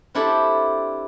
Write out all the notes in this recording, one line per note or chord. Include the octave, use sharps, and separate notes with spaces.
C4 D4 E4 G4 A4 C5